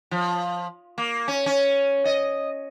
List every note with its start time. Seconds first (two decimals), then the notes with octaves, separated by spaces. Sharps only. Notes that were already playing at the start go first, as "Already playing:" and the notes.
0.11 F3
0.98 A#3
1.28 C#4
1.46 C#4
2.05 D#5